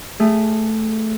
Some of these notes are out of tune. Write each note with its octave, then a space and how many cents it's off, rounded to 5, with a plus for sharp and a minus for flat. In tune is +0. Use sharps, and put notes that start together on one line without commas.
A3 +0 G#4 -15